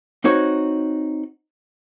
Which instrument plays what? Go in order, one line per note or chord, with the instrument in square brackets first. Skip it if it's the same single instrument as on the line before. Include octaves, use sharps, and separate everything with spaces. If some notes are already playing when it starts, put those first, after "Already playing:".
[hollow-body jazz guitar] C4 D#4 F#4 C#5